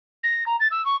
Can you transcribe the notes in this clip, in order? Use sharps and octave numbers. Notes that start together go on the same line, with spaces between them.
A#6
A#5
A6
E6
C#6